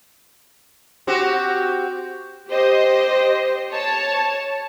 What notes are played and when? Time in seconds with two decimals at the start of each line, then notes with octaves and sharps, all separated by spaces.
1.07 C4 F#4 G4
2.47 G4 C5 D#5
3.71 C#5 A5